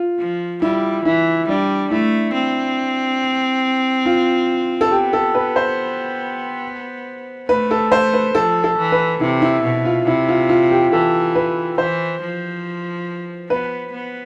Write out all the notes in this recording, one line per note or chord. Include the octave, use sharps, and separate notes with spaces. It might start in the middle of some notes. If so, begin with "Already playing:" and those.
Already playing: F4
F3
G3 E4
E3 E4
G3 D4
A3 E4
C4
F4
A4
B3 G4
A4
B4
C5
A3 B4
A4
C5
B4
F3 A4
A4
E3
B4
C3 E4
E4
B2
F4
C3 E4
F4
F4
G4
E3 A4
B4
E3 C5
F3
B3 B4
B3